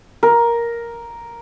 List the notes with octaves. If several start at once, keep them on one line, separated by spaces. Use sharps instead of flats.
A#4